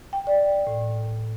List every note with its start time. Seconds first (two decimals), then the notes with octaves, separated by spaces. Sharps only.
0.13 G5
0.27 D5
0.67 A2